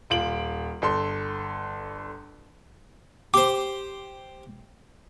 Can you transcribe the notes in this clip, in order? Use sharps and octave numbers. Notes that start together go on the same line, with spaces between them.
D#1 F4 D7 F#7
G1 A4 C6
G4 C5 D6